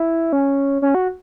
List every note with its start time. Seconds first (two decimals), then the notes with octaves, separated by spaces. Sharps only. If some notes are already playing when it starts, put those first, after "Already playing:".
Already playing: E4
0.33 C#4
0.82 C#4
0.95 F#4